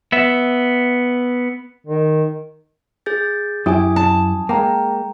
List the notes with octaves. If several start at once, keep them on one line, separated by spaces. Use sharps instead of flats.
B3 E5
D#3
G#4 G6 A6
F#2 E4 G4 G#5 D#6
A5
G#3 A#3 G5 A#5